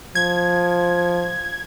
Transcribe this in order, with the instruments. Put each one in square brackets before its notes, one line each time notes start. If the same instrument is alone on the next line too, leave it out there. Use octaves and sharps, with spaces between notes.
[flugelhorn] F3 [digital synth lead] G#6